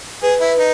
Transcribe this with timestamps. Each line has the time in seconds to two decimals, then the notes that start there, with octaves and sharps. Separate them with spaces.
0.22 G#4 B4
0.40 E4
0.58 D#4